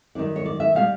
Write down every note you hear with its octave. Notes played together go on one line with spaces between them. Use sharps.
F#2 D#3 G3 D5
C#5
D5
E5
B2 G3 F5